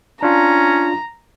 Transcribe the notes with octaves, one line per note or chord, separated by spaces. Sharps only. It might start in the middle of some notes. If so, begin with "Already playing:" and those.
C#4 D4 F4 A#5